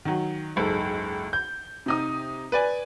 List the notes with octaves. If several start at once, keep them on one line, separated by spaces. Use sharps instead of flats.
D#3 F#3
F#1 C#2 G#2 A4
G6
C3 D#4 D#6
B4 D5 G#5